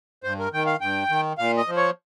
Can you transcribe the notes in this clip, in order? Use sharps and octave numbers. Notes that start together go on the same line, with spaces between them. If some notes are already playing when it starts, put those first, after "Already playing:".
G2 C5
A#4
D#3 G5
F5
G2 G5
D#3
A#2 F5
D#5
F3
C#5